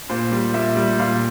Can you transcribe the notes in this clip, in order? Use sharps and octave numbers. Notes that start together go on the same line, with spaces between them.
A#2 C5
G3
A#2 E5
G3
A#2 F5